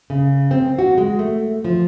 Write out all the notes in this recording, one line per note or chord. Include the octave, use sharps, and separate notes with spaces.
C#3
C4
F#4
G#3
A3
F3